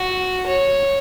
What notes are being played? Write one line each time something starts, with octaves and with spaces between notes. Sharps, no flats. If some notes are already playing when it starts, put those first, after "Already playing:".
Already playing: F#4
C#5